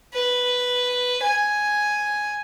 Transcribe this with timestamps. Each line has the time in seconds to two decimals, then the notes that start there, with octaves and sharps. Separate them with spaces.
0.14 B4
1.23 G#5